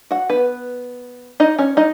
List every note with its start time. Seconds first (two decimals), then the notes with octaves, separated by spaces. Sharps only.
0.11 F#4 F#5
0.30 B3 B4
1.40 D#4 D#5
1.59 C#4 C#5
1.77 D#4 D#5